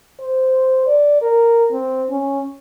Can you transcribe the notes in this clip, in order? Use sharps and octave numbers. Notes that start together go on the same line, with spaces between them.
C5
D5
A#4
C4
C#4